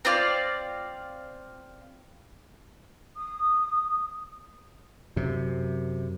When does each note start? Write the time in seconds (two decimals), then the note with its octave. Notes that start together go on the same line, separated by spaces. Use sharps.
0.05 C4 F4 D5 F5
3.15 D#6
5.16 F#2 C3